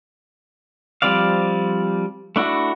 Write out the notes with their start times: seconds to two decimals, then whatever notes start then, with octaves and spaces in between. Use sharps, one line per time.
1.02 F3 G3 C4 D5 F5
2.36 A3 D4 E4 F#4